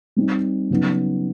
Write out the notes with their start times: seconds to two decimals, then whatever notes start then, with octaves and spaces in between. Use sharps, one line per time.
0.16 G3 C4 D#4
0.70 C#3 F#3 B3 D#4